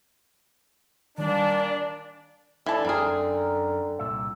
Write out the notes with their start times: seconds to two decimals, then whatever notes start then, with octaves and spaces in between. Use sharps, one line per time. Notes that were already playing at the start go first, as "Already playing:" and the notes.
1.18 A#2 D#3 G3 D4 D5
2.66 D3 E3 D4 E4 A5
2.85 F#2 C4 G#4 A#4
3.99 C2 A#2 E5